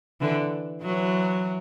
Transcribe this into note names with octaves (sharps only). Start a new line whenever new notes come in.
D3 E3
E3 F#3